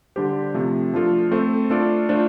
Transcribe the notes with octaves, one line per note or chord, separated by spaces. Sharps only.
D3 G3 D4 G4 C5
C3 F3 A3
F3 A3 D4 F4 A4
A3 C4 A4 C5
A3 D4 F4 A4 D5
A3 D4 F4 C5